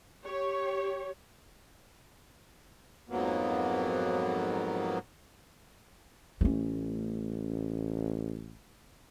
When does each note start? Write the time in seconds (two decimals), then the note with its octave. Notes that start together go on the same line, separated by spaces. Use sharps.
0.25 G4 C#5
3.09 F2 G#2 F#3 A#3 B3
6.41 A1 A3 C#4